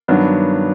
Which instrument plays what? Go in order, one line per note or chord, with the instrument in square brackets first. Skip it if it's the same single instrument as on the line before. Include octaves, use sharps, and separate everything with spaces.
[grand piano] G2 D#3 F#3 B3 D4